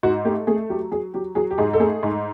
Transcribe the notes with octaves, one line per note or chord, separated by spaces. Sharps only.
G#2 F#4
A3 G4
A3 G#4
F#3 G4
F#3 G#4
F#3 G4
F#3 G#4
G4
G#2 G#4
A4
A3 G#4
G#2